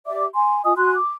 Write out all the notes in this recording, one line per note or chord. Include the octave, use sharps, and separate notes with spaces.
G4 D5 E5 D6
G#5 C6
F4 D#5 G#5 D#6
F#4 G#5 C6 F#6
D6